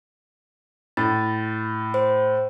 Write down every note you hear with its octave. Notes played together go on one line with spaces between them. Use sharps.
A2 A6
C5